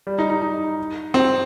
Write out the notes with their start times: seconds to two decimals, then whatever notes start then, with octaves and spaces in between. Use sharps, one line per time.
0.07 G3
0.19 D#4
0.30 D#4
0.42 D#4
1.14 C4